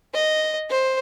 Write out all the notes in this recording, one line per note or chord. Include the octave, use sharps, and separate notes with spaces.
D#5
C5